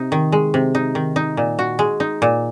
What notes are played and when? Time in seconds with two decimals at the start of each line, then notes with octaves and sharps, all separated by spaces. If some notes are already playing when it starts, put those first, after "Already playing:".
Already playing: C3 D#4
0.12 D#3
0.32 G#3
0.54 C3
0.75 D#4
0.95 D#3
1.16 D#4
1.37 A#2
1.59 F#4
1.79 G#3
2.00 D#4
2.22 A#2